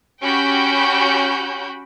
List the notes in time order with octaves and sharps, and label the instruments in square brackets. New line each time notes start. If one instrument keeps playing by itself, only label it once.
[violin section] C#4 F#4 G4 G5 B5 G6